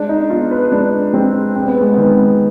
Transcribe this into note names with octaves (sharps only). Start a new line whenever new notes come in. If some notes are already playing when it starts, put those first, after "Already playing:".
Already playing: G#3 D4
D#4
B3 F4
B4
G#3 D4
G#3 C4
C3 C4
B3
G#3
D#3 B3